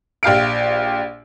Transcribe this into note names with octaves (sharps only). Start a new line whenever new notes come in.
A#1 G4 F5 D7